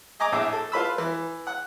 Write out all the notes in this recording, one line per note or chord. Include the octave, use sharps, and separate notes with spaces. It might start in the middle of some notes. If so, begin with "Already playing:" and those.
D#5 G#5 A#5 D6
A#1 A2 E5 D6
A4
F4 B4 B5 E6
E3
F#5